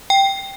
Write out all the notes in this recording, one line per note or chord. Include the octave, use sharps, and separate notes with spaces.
G5